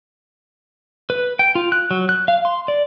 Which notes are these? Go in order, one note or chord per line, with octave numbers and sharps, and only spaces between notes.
B4
G5
F4
F#6
F#3
F#6
F5
C6
D5